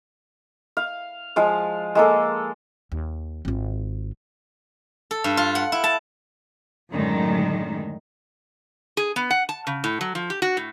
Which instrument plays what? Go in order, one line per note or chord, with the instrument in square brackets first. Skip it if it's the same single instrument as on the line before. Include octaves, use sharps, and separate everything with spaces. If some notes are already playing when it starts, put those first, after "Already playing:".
[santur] F5
F3 G#3 F5
G#3 A#3 A4
[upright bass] D#2
G#1 F4
[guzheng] A4
G2
F4
F#5
E4
A5
[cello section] F#2 A2 D3 D#3 G#3
[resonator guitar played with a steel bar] G#4
B3
F#5
A5
C#3
A2
F#3
F3
G4
F#4
A2